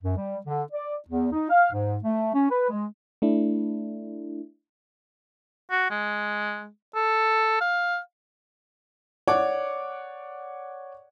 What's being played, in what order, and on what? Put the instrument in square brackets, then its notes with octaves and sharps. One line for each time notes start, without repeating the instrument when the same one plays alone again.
[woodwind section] F#2
G3
D3
D5
E2
D#4
F5
G#2
A3
C#4
B4
G#3
[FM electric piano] A3 D4 E4
[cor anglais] F#4
G#3
A4
F5
[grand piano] C#5 D5 F#5 C#6 D6